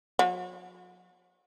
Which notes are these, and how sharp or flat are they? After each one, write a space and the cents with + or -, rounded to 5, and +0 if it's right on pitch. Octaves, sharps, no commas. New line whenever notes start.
F#3 -40